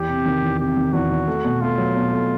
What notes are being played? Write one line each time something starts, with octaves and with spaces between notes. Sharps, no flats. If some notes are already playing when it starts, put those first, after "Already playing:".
Already playing: E2 G4
C3
D#3
E2
C3 G4
D#3
E2 F#4
E2
A3
B2
A3 F4
F#3
B2
A3